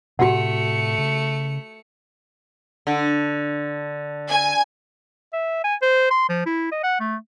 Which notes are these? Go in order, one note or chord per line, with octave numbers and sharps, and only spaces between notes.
A2 C3 A3 F#4 G4 F#5 C#7
C#3
D3
G#5
E5
G#5
C5
C6
F3
E4
D#5
F#5
A3